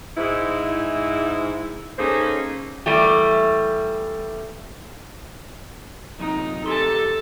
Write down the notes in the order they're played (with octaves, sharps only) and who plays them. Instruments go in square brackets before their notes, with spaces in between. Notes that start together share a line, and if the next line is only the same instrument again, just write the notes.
[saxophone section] G#2 E4
A#3 C#4 D#4 G#4 A4 C5
[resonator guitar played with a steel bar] E2 G3 A3 G4
[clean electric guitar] F#2 C3 [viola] D#4
[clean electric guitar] D2 G4 C6 [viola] A4 A5